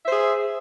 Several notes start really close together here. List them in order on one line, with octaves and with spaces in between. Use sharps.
E5 C5 G#4